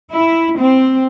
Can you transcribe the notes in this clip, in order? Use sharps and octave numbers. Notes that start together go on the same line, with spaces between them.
E4
C4